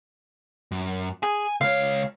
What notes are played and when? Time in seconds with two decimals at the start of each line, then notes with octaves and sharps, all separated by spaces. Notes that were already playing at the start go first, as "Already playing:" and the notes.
0.71 F#2
1.23 G#4 G#5
1.61 C#2 C#5 F5